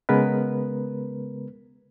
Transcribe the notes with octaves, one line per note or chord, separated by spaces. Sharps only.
C#3 G#3 B3 A#4 B4